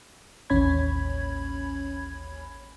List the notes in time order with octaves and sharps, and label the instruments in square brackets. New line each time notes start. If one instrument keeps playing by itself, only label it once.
[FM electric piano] A1 D#2 C#4 C#5 B5 G#6